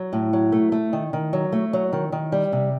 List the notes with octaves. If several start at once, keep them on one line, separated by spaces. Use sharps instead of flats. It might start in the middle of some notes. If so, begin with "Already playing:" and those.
Already playing: F#3
A2
F#3
A3
A3
D#3
D#3
F#3
A3
F#3
D#3
D#3
G3
C3